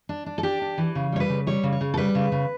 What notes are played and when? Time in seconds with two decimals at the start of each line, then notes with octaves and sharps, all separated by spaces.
0.09 D4
0.26 D4
0.38 A4
0.43 D4 G4
0.61 D4
0.78 E3
0.95 C#3
1.12 G3 C#5
1.20 B4
1.29 C#3
1.47 G3 C#5
1.63 C#3
1.72 C#5
1.81 C#3
1.94 A4
1.97 G3 B4
2.15 C#3
2.32 C#3